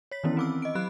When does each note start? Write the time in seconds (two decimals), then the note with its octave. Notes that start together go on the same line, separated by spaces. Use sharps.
0.11 C#5 B6
0.24 D#3 E3 B3 C#4 E4
0.37 C4 D6 E6
0.62 D#5 D7
0.75 F#3 G4 B5 F#6